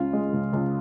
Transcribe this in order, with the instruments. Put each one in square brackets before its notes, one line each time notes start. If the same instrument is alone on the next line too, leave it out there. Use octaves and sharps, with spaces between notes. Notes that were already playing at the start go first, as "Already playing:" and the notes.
Already playing: [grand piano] C#2 C#3 F4
G#3
C#2
C#2